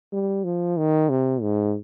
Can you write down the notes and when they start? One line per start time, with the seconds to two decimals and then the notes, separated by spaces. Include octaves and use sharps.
0.12 G3
0.44 F3
0.77 D#3
1.09 C3
1.42 G#2